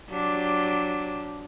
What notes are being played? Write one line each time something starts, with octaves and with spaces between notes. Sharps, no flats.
F#3 D4 G4